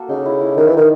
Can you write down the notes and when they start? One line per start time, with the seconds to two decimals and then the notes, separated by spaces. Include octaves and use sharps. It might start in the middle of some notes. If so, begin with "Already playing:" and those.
Already playing: A#3 F#4 A4
0.09 C#3 D#4
0.26 E4
0.41 E4
0.57 D#3 G4
0.67 E3
0.73 D#3 D#4